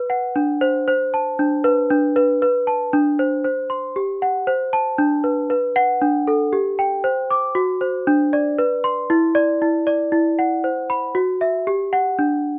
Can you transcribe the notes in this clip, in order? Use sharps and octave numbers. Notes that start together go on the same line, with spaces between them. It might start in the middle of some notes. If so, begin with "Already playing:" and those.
Already playing: B4
F#5
D4
C5
C5
A5
D4
B4
D4
B4
B4
A5
D4
C5
C5
C6
G4
F#5
C5
A5
D4
B4
B4
F#5
D4
A4
G4
G5
C5
D6
F#4
C5
D4
D5
B4
C6
E4
D5
E4
D5
E4
F#5
C5
B5
F#4
E5
G4
F#5
D4